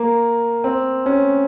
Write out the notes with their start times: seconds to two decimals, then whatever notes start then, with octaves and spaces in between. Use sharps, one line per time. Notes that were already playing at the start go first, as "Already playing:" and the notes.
Already playing: A#3
0.64 C4
1.06 C#4